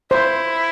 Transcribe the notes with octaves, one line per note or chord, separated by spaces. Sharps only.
E4 C5